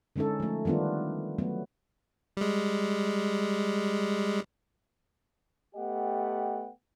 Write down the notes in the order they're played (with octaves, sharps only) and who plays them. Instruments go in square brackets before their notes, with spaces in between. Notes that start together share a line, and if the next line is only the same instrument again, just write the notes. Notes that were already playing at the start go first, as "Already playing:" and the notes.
[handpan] D3 G#3 C#4 D#4 A4
F3 A3
D#3 G3 B3 D4 F4
F#3 A3 B3
[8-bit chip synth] G3 G#3
[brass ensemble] A3 B3 G4 D#5 F#5 G5